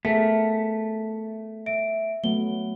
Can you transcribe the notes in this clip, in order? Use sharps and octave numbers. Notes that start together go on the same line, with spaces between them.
A3 B3 G#4 A#4 E5 B6
E5 D7
F#3 A3 B3 G7